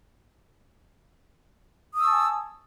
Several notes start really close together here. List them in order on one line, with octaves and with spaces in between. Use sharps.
D#6 E6 C#6 A5 G#5